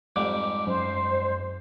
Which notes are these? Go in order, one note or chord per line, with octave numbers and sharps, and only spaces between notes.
F2 G#2 G3 D6
F#2 C5